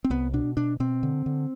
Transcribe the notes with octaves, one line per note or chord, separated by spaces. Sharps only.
C4
C2 B3
B2 D4
B2 D4
B2 C4
D3
D3